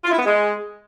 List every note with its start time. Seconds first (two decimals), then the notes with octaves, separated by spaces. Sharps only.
0.04 F4
0.11 E4
0.18 B3
0.25 G#3